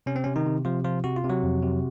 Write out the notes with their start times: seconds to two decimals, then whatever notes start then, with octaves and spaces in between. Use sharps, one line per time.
0.06 C3 C#4
0.16 C4
0.24 C3 C#4
0.36 D#3 D#4
0.46 C3
0.65 C3 F3 F4
0.84 F3 F4
1.04 C3 F#4
1.16 F4
1.24 C3
1.29 F#3 F#4
1.43 F2
1.63 C3